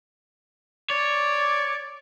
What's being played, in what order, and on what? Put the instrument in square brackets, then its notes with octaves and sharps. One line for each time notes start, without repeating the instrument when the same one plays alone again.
[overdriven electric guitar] C#5 [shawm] D5